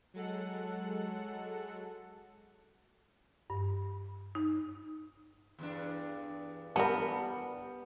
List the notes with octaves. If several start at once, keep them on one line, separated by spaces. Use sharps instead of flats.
F#3 G#3 A4 F#5
G2
D#4
E2 G2 D4
G3 B3 A#4 F#5 A5